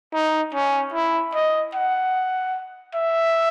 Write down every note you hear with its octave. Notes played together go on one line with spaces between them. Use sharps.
D#4
C#4
E4
D#5
F#5
E5